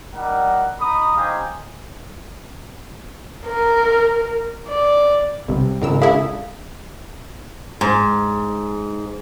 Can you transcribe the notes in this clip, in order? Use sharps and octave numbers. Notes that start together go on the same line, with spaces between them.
G3 D#4 A#4 F#5
D#4 A#5 B5 D#6
C4 D#4 G4 F5 G5 G#5
A#4
D5
B1 C3 G3
G#1 C#2 G#2 A#4 E6
D4 E4 A4 F5
G#2